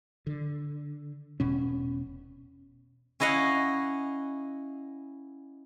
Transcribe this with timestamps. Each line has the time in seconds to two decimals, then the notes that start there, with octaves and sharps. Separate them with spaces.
0.27 D3
1.40 E1 B2 C#4
3.20 C#4 E4 D#5 F5 F#5